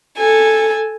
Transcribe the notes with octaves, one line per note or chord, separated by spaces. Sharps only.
A4 G#5